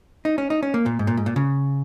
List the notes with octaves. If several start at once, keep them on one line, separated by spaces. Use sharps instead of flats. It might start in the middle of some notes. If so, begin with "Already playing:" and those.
D#4
C#4
D#4
C#4
A#3
A#2
G#2
A#2
G#2
A#2
C#3